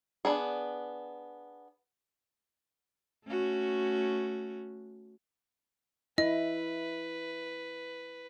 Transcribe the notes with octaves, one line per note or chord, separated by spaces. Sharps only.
B3 D4 G#4
A3 C#4 F#4
E4 B4 D#5